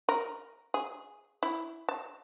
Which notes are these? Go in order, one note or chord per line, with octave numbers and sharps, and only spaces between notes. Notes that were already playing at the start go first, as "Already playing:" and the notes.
A#4
G#4
E4
A5